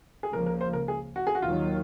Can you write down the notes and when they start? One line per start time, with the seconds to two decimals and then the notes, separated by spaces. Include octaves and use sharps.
0.23 G#4
0.32 C#2 C#3 F3 A#3 A#4
0.46 A#4
0.61 C5
0.73 A#4
0.88 G#4
1.16 F#4
1.27 G#4
1.35 F#4
1.42 D#2 D#3 F#3 F4